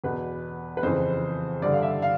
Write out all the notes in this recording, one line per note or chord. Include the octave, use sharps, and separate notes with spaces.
E2 B2 B4
B4
F2 C#3 E3 C5
G2 D3 D5
F5
E5
F5